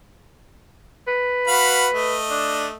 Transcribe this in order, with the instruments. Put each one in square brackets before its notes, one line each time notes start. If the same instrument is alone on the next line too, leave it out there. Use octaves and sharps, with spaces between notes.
[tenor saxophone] B4
[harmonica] F#4 F5 B5
A3 D#5
[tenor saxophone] D4